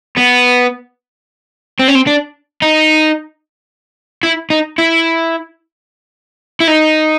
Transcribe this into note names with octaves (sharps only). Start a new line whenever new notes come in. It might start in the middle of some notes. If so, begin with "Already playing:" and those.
B3
C4
C#4
C4
D4
D#4
E4
D#4
E4
E4
D#4